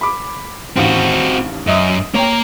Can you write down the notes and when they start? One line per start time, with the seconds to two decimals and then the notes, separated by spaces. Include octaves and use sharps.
0.01 B5 D6
0.77 A1 D#2 C4 F#4 F5
1.67 F#2 D#5 E5 D#6
2.14 A#3 C#5 G5 A#5